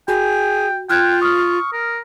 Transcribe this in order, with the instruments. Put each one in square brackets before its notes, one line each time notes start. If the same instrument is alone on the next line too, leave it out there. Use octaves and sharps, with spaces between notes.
[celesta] F#4 [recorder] G#4 [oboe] G5
[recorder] F4 [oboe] G5 [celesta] F6 F#6 G#6
[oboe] C#6 [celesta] D#6 F6
[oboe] A#4